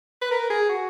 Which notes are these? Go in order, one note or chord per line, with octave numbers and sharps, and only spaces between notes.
B4
A#4
G#4
F#4